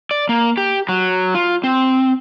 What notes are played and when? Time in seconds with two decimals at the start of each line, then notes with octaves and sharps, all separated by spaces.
0.11 D5
0.29 A#3
0.58 G4
0.89 F#3
1.35 F4
1.64 C4